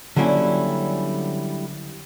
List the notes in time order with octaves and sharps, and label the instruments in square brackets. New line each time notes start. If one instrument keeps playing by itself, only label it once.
[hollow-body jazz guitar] D3 F#3 G3 A#3 C#4 E4